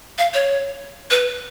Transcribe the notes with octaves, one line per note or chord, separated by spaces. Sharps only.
F5
C#5
B4